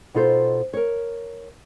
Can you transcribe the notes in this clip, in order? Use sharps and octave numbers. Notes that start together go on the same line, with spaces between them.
B2 D#4 F4 A4 C5
A#4 C#5